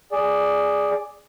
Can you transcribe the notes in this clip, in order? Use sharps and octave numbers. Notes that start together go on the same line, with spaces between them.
G#4 D5